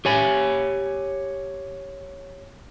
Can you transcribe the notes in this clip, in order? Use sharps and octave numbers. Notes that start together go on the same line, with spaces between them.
G4 C#5 G#5